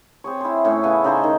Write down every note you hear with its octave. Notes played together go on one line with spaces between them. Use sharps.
C4 G#4 C#5
E4 C5
A2 C#4 E5
C#3 B3 G#5
C#3 D#4 C5 C#6
D#3